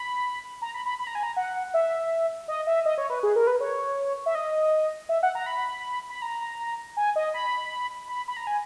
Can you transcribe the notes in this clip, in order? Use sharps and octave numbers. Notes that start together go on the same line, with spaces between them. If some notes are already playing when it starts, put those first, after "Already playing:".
Already playing: B5
A#5
B5
B5
B5
A#5
G#5
A#5
F#5
E5
D#5
E5
D#5
C#5
B4
G#4
A#4
B4
C#5
E5
D#5
E5
F#5
A#5
B5
B5
A#5
G#5
D#5
B5
B5
B5
A#5
G#5